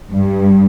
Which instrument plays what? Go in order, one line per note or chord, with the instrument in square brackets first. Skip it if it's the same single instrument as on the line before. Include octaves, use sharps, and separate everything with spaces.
[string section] G2